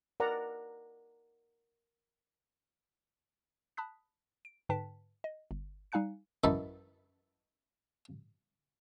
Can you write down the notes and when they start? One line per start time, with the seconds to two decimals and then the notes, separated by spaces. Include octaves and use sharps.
0.20 A#4 D5 F#5 A#5
3.77 A5 B5 D#6 F#6 B6
4.45 D7
4.69 G#2 D3 B4 G5 A5 B6
5.24 D#5
5.51 G1
5.92 G3 D#4 F5 G#5 F#6 C#7
6.44 F#2 E3 D#4 A5 B5